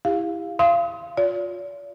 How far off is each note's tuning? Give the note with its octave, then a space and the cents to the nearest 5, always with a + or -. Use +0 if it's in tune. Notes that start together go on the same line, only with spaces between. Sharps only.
E4 +0 G4 +25 F5 +0
F5 -30 C6 +0 D#6 +35
F4 +25 D5 -45